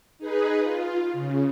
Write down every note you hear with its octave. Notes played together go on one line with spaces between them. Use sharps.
D#4 G#4 B4
F4
C#3